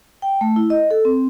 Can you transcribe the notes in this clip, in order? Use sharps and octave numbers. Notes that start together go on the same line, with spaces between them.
G5
A3
E4
D#5
A4
C4